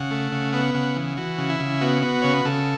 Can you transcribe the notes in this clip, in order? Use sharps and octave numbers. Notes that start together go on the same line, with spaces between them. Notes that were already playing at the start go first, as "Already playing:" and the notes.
Already playing: C#3 F#5
A3
C#3
B3 F#5
C#3 F#5
E3
E3 F#4
C#3
E4
C#3
B3 F#4
B3
C#3 C#5
B4
C#3 A4